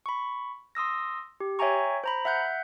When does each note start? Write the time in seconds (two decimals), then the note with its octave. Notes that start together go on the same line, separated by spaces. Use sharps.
0.06 B5 C#6
0.75 C6 D#6 E6 A#6
1.40 G4
1.59 C#5 E5 G5 G#5 A#5 C#6
2.04 C5 A#5 B5
2.25 E5 F#5 F#6 G6